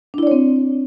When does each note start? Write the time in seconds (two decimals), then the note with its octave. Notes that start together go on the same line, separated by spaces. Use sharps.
0.14 D4
0.18 E4
0.23 D5
0.27 C#5
0.31 C4